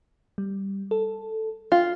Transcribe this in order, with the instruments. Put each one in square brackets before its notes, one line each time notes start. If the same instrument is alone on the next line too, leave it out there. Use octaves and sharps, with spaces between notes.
[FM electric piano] G3
A4
[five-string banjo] F4 [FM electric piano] G5